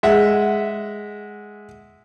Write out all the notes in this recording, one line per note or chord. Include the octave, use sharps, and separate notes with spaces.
G#3 E5 F#5